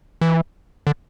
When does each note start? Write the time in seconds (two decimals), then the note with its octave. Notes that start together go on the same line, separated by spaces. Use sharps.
0.21 E3
0.87 D3